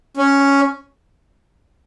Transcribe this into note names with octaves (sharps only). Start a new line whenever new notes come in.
C#4